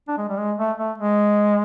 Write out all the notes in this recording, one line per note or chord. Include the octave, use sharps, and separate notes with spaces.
D4
G#3
G3
G#3
A3
A3
G#3